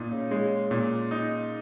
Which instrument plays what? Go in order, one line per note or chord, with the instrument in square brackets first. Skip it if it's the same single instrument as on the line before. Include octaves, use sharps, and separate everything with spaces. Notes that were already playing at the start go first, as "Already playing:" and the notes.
Already playing: [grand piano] A#2 D#4
[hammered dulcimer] C#3
[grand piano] G#3
A#2
D#4